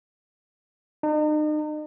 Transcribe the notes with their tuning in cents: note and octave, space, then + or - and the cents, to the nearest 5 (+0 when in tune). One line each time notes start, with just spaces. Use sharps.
D#4 -40